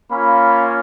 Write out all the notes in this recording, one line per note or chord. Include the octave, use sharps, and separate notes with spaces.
A#3 C#4 F4 B5